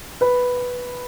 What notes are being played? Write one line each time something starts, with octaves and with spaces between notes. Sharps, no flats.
B4